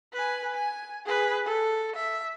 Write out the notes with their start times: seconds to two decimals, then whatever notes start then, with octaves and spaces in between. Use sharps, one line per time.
0.13 B4 G#5
0.55 G#5
1.06 G#4 B4
1.46 A4
1.96 E5